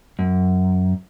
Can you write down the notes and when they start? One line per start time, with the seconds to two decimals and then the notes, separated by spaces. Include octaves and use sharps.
0.19 F#2